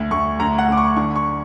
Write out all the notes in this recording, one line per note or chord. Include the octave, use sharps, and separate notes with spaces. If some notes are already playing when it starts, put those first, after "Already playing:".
Already playing: D2
D2 C#6
D2 A#5
F#5
D2 D6
C#6
D3 C#6
C#6